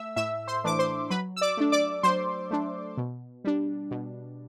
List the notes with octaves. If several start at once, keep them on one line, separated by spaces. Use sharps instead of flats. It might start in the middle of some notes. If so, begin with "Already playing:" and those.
Already playing: A3 E5 E6
A2 E5 E6
C5 C6
E3 A3 D4 D6
C5 C6
F#3 B4 B5
E6
D5 D6
A3 D4
D5 D6
F#3 C5 C6
A3 D4
B2
G3 D4
B2